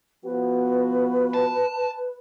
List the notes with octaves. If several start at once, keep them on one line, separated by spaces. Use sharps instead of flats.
F3 B3 F#4 B4
A5